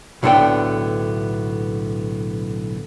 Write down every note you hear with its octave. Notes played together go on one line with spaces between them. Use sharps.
B1 A2 D3 A3 B3 G5